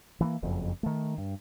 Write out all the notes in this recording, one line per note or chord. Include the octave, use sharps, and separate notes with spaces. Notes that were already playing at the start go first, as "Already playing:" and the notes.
E3 A3 A#3
F#1 F2
D#3 A3
G2